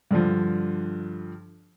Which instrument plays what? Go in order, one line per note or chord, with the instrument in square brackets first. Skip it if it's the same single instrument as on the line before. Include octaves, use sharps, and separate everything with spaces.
[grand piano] G2 D3 F3